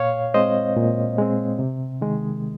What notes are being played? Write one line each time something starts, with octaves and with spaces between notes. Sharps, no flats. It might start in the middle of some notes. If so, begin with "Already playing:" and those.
Already playing: A#2 C#5 F5
G#3 C4 C5 D#5
A#2
G#3 C4
C3
D#3 G#3